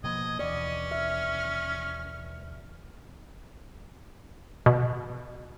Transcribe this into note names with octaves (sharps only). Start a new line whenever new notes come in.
B2 F3 A#3 D#5 G#6
D#2 B2 E3 C#4 D5 D#5
E5 F6
B2